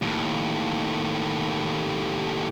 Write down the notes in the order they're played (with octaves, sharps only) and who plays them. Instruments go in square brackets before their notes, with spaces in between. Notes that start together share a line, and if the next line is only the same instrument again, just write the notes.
[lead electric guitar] D#2 A2